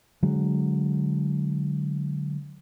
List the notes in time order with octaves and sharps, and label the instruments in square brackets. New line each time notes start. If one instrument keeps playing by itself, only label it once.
[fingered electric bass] D3 F#3 G#3